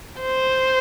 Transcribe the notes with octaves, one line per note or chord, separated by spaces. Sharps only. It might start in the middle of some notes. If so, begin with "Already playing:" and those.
C5